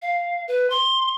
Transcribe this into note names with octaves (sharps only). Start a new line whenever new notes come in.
F5
B4
C6